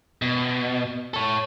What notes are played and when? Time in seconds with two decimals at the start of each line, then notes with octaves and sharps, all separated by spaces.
0.22 B2
1.14 A4 C#5